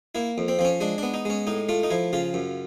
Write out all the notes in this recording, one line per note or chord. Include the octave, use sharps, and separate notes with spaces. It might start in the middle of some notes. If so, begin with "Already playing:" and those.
A#3 E4
F2
C4
F3 C4
C#4
G#3 D4
B3 D4
D#4
G#3 C#4
A2 D#4
A3 F4
D#4
F3 E4
C#3 F4
F#2